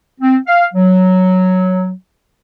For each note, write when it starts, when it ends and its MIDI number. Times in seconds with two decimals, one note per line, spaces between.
0.21 0.37 60
0.47 0.65 77
0.74 1.91 54